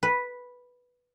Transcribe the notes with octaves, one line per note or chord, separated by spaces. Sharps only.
B4